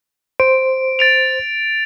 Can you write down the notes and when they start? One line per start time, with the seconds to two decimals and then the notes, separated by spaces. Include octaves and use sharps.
0.40 C5 D7
0.99 A6 D7 F7